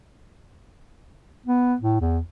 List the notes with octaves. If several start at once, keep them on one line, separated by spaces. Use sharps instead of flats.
B3
A2
E2